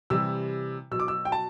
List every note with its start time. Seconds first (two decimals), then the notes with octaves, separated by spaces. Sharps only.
0.10 C3 E3 G3 E6
0.91 B2 F#3 E6
1.00 D6
1.08 E6
1.25 G5
1.32 A5